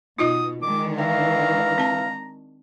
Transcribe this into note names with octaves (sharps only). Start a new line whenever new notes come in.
B2 D#4 F4 D#5 D#6
D#3 G#3 D4 D6
E3 F5 G5 A#5
C4 A5